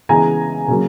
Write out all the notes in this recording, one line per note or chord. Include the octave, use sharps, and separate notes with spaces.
C#3 E3 G#3 B3 G#5 A#5
C#3 F#3 A#3